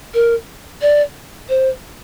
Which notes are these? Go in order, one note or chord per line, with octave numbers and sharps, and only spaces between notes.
A#4
D5
C5